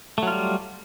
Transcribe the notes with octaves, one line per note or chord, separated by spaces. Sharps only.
F#3 G3 A3 F4